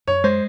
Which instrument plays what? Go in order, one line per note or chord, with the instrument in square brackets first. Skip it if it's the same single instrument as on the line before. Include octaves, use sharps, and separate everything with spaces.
[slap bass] F#2 [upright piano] C#5
[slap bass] G#3 [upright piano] C5